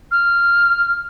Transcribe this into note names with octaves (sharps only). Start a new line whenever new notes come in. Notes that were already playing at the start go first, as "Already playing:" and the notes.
F6